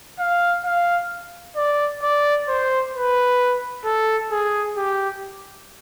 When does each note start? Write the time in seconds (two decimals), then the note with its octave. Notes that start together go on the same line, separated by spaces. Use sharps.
0.19 F5
0.64 F5
1.56 D5
2.02 D5
2.48 C5
2.94 B4
3.85 A4
4.31 G#4
4.76 G4